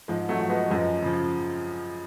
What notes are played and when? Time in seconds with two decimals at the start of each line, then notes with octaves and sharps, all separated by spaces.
0.08 G#2 F3 G#3
0.29 F#3 A3
0.40 F3
0.50 G#3 B3
0.70 F#2 F3 G#3
1.02 C#3 F3